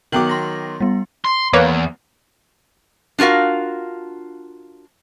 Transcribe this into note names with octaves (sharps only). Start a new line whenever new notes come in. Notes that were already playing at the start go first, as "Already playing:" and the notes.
D#3 F#3 B3 G5 D6 F#7
C6 A#6
G3 B3
C6
E2 A#3 B4 C#5
D4 F4 F#4 A#4 F5